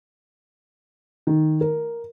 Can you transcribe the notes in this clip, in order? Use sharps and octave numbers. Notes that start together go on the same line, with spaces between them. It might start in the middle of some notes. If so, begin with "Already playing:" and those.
D#3
A#4